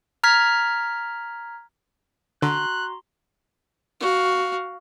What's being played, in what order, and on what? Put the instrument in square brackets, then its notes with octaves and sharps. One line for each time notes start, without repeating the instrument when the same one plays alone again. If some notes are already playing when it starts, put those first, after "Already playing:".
[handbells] A#5 F6 G#6 B6
[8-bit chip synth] D3 [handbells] F#4 A#5 C6 [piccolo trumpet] F#6
[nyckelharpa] F#4 F5